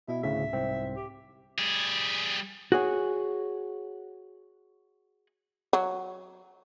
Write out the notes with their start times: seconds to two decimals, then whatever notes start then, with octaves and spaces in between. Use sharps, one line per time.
0.08 B2 E4
0.23 D2 A2 C#3 E5
0.53 C2 G#2 C4
0.96 G4
1.58 G3 G#4
2.72 F#4 G#4 C#5
5.73 F#3